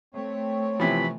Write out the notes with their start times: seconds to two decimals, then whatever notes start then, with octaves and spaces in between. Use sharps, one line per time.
0.15 A3 C4 C#5
0.80 C3 E3 F3 B5